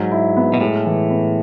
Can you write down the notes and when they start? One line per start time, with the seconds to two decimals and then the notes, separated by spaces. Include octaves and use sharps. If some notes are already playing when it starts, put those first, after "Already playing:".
Already playing: G#2 F#3
0.11 E4
0.37 B3
0.54 B2
0.61 A2 G#3
0.86 E3
1.10 B3